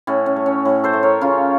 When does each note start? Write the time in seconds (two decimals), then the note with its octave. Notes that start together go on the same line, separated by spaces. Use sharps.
0.07 A2 C#4
0.26 C#4
0.36 A3
0.46 C#4
0.65 A2
0.84 A4 C5
0.93 A3
1.03 A#4 C#5
1.21 C#3 C#4 F4